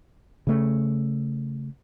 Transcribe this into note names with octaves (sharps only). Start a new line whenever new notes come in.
C#3 A3